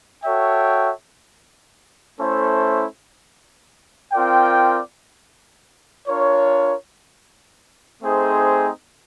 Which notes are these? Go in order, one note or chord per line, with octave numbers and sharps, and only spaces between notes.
F#4 A4 C#5 E5 G5
A3 C#4 E4 A4 C5
C4 F4 A#4 D5 G5
D4 F4 A#4 C#5
A3 C4 D#4 G#4 C5